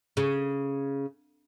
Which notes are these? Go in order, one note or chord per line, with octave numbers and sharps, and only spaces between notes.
C#3